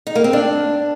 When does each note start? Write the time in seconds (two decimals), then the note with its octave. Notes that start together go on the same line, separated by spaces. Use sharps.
0.07 D#4
0.15 A#3
0.24 C4
0.33 D4